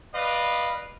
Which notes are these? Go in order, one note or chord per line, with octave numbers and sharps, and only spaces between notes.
B4 D5 D#5 F5